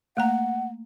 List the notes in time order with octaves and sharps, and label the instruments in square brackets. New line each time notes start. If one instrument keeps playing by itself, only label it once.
[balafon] A3 A#3 A#5 [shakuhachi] F#5